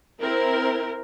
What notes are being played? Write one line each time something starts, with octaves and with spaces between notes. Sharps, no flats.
C4 E4 A#4